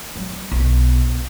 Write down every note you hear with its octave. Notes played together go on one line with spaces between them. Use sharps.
F#3
B1